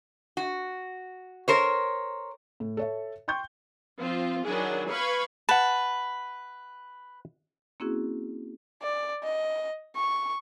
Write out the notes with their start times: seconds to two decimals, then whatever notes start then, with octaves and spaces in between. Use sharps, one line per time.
0.37 F#4
1.48 A#4 C5 C#5
2.60 A2
2.77 A4 C#5 E5
3.28 G5 C6 C#6 G6
4.00 F3 C4 F4
4.45 D#3 F#3 D4 E4 G#4
4.89 B4 F5 B5 C#6 G#6
5.49 B4 F#5 A5
7.80 A#3 C4 C#4 E4 F#4 G#4
8.82 D5
9.24 D#5
9.96 C#6